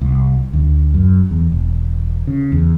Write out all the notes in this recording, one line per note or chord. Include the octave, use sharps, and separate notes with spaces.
C2
D2
F#2
E2
E1
C#3
E2